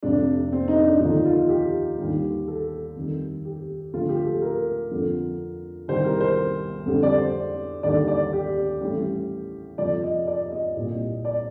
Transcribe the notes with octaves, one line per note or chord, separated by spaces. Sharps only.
F1 F2 C3 D4
C4
D#4
D4
D#2 D3 F3 D#4
F4
G4
D#2 D3 G3
A4
F2 D#3 G3
G4
D2 D3 F3 F4
G4
A4
A#4
F2 D3 F3
C2 C3 D#3 G3 C5
A#4
C5
F2 D3 G3
D5
C5
D#2 D3 G3 D5
D5
G4
A1 A2 G3
F2 C3 F3 D5
D#5
D5
D#5
C2 A#2 G3
D5